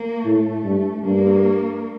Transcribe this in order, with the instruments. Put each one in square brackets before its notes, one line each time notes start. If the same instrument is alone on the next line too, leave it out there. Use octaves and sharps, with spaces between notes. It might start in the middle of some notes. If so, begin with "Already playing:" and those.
Already playing: [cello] A#3
[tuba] A2 [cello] A3
[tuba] G2
[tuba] G2 [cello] A#3